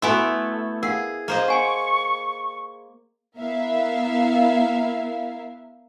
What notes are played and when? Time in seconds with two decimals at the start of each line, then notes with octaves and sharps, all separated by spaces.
0.02 A3 B3 E4 F#4 G#5 C6
0.83 G#4 A#4 F5 F#5
1.28 A#3 C5 D#5
1.48 F#5 G#5 C6 C#6
3.38 B3 E4 A#4 E5 F5